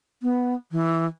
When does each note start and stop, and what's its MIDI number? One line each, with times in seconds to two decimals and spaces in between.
0.23 0.54 59
0.72 1.06 52